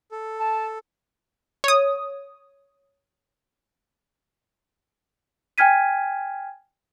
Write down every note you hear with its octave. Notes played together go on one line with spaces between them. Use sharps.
A4
A5
C#5 D#6
G5 G#5 F6 G#6 B6 D#7